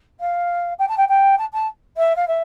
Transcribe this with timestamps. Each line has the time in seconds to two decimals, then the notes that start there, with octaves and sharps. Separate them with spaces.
0.20 F5
0.79 G5
0.88 A5
0.97 G5
1.08 G5
1.38 A5
1.52 A5
1.97 E5
2.15 F5
2.27 E5